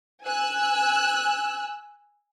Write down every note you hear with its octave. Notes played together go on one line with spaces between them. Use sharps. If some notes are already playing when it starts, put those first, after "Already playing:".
G#5 E6 F#6